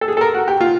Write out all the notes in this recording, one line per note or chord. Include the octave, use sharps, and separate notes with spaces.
A4
G#4
A4
A#4
F#4
G4
F4